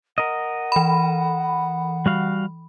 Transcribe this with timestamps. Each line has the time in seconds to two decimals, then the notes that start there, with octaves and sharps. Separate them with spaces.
0.18 A#4 D#5 F#5
0.72 E3 B5
2.06 G3 F#4 F5